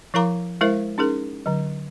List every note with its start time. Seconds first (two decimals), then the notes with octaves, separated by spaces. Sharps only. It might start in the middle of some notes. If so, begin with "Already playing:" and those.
0.14 F3 E4 A#4 F5 A#5 D6
0.61 G#3 E4 A#4 C5 E5
0.98 C#4 D#4 G#4 A#4
1.46 D3 F#3